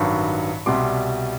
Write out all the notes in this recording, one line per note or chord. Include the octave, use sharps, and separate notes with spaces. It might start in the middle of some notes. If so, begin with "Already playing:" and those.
Already playing: A1 G2 D#3 F#3 B5 C#6
C2 B2 G3 C6 D6